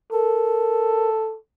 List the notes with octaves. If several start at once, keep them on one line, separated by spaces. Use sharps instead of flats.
A4 A#4